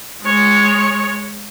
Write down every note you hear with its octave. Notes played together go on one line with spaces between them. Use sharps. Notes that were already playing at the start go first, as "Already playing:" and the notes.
G#3 C#5